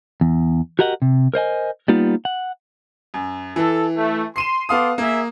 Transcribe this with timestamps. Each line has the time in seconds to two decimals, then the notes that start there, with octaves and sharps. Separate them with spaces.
0.21 E2
0.79 F#4 G4 A#4 D#5 F#5
1.02 C3
1.34 A#4 C5 D#5 G#5
1.88 G3 A#3 B3 D#4 F4
2.25 F#5
3.14 F#2
3.56 E3 A4
3.96 A3
4.36 C6 C7 D#7 E7
4.69 B3 A4 F5 C6 D6 D#6
4.98 A#3 G#4 A#4 E5